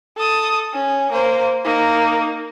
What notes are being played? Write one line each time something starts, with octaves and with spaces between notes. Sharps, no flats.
A4 D#6
C#4
A#3 C5
A#3 D#4